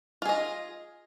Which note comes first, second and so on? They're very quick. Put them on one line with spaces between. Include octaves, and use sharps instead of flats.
F4 G#4 D#5